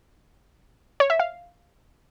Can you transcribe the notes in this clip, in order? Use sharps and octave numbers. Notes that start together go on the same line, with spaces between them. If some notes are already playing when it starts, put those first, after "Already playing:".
C#5
E5
F5